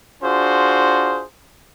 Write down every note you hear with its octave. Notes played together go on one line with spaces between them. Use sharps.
D4 F4 F#4 G#4 C5